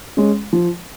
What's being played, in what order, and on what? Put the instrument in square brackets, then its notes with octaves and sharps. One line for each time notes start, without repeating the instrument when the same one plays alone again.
[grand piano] G#3 C#4
F3